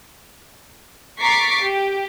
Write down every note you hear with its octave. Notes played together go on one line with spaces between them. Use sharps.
A#5 C#6 D6 A6 B6 C7
G4